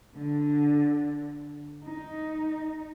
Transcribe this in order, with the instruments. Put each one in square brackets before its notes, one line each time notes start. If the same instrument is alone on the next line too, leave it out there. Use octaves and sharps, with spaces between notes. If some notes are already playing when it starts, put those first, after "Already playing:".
[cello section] D3
D#4